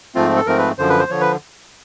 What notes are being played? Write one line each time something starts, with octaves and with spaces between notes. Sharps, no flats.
G#2 F3 A3 C4 F4
A4
G#2 F3 A3 C4 A#4
B4
F#2 D3 F3 C5
B4
C5
D3 F3 C#5
B4